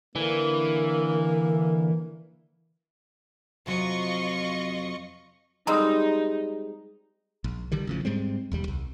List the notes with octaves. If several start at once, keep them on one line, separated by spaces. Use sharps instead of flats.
D3 E3 A#3
F2 C3 F#3 F4 D#5 C#6
G3 G#3 C4 D#4 A#5 D#6
A#1
D3 D#3 G3
A1 C#3 F3
G#2 G3 G#3 C4
E1 D#2 G3
C2